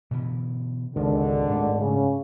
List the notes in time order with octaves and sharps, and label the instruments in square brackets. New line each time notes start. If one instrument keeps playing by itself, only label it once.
[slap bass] B2 D3 E3
[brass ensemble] G#1 D3 [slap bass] C#2 D#3
[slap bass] G#2 A3
[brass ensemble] C#3